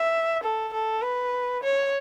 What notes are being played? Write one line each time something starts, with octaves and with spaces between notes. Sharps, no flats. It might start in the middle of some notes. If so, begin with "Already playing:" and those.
Already playing: E5
A4
A4
B4
C#5